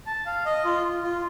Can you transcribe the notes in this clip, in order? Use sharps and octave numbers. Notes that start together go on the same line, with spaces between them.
A5
F5
D#5
F4
F4